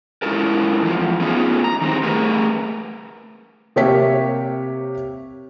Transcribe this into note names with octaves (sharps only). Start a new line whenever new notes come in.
G#3 C#4 E4 F4 A4 A#4
E2 F3
A3 B3 C#4 D#4 F4 G#4
A#5
D#3 G3 C4
A3 G#4 A#4 B4
C3 A#3 G4 C#5 E5 B6